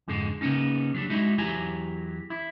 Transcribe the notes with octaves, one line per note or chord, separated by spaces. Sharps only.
F2 G#2 D3 G#3
C#3 A#3 B3 C#4 D#4
F#3 G3 D4
G#3 D#4 E4 F#4
E2 F#3 E4 G4 G#5 A#5
E4